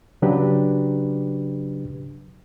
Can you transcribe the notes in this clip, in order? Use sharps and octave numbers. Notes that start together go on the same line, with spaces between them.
C#3 F#3 D4 G4 B4